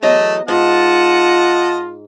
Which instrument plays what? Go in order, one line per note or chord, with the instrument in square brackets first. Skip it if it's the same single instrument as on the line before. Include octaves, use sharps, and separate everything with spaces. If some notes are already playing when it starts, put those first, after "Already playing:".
[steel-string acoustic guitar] E2 F#3 D#5 [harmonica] A3
[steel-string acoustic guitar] G#2 [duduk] F4 [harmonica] D#5 F#5 A5